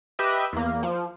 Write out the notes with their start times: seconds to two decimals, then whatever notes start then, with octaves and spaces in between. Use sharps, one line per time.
0.19 G4 B4 D#5 E5
0.53 E2 A#3
0.83 F3